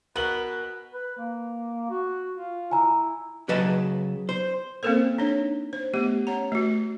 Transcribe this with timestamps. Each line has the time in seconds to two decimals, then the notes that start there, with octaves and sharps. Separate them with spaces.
0.16 B2 B3 A#4 B4 F#7
0.93 B4
1.17 A#3
1.90 F#4
2.33 F4
2.71 E4 G#5 A#5
3.49 C#3 F#3 B4 D#5 A5
4.29 C5
4.83 A#3 C4 C#4 A4 A#4 C5
5.18 D4 D#4 C#5
5.73 C5
5.94 A3 B3 G4
6.27 C#4 C#5 F#5 A#5
6.52 A3 F#4